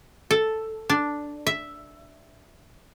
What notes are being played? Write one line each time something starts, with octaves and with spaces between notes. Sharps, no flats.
A4
D4
E5